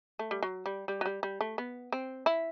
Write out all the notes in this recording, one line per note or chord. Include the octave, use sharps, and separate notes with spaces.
A3
G3
F#3
G3
G3
F#3
G3
G3
A3
B3
C4
E4